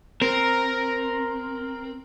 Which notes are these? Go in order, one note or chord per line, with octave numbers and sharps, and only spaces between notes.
C4 A#4